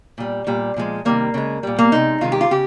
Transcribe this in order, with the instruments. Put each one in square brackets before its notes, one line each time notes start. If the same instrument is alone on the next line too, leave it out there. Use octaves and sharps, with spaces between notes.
[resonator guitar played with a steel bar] A#2 G3
A#2 G3
A#2 F3 G#3
C3 D#3 G3 A#3
C#3 G#3
A#2 G3
A#3
C3 F3 G#3 D#4
C3 D#3 G#3 F4
G4
F4
C#3 G4